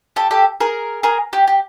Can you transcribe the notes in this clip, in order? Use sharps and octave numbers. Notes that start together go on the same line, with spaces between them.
G4 A4
G4 A4
G#4 A#4
G#4 A#4
G4
G4